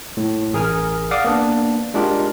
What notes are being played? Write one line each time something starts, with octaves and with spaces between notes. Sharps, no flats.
A2
A1 G#4 A#4 G#5 F6
D5 F5 F#5 D6 D#6
A#3 B3 D4
G#3 D4 F4 G4 A#4